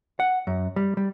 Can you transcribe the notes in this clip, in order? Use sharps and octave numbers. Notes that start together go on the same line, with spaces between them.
F#5
F#2
G3
G3